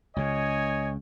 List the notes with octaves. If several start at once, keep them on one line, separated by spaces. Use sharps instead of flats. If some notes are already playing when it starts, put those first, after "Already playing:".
C#2 C#3 C#5 D#5 G#5